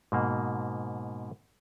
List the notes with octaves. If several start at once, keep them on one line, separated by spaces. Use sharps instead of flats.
G#2 B2 A#3